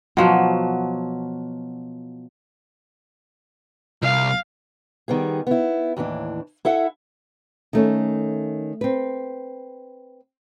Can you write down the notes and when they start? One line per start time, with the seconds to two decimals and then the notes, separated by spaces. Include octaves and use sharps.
0.17 B2 F3 F#3
4.02 C2 F5
5.08 D#3 G3 B3 G#4
5.47 B3 E4
5.97 D#2 A2 E3 D4
6.65 E4 A4 E5 F#5
7.73 D#3 A3 C#4
8.81 C4 B4